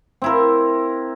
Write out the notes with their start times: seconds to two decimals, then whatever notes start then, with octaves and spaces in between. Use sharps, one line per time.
0.22 C4 E4 A#4